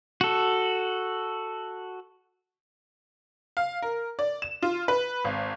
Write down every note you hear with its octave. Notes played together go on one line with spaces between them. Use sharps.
F#4 A4
F5
A#4
D5
E7
F4
B4
G#1